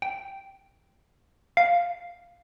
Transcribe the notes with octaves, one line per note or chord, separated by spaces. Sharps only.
G5
F5